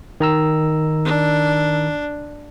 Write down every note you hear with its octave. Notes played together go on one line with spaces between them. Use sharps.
D#3 A#5 E6
D4